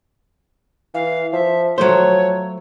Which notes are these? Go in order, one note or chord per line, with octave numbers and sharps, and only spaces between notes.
E3 F5
F3 E5
F3 F#3 A3 C5 C#5